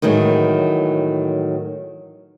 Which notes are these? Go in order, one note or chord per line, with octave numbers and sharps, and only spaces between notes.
A2 D#3 E3 F#3 G#3